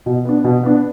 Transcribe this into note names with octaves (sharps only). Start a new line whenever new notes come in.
B2
B3 D4
B2
B3 D4